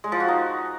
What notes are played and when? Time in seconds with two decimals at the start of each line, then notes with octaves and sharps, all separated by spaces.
0.04 G#3
0.12 F3
0.20 F#4
0.28 D#4